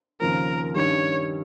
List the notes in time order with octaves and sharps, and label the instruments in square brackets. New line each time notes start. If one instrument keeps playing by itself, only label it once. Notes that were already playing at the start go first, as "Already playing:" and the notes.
[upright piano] D#2 C#3 F3 C4 [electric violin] A#4
[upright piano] G2 D#3 G3 C#4 [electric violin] C#5